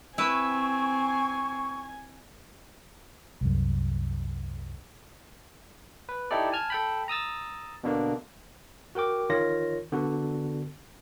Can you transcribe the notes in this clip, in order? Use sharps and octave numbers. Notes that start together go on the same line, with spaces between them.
C4 E4 B4 G#5 C#6
C2 F#2
B4
D#4 E4 G4 A4 D5
G#5 A5 F6 G#6
A4 G5 B5
A#5 D#6 E6 A6
B2 D3 A#3 D4
F#4 A#4 G5 D6
D#3 F4 C#5 A#6
D3 B3 F#4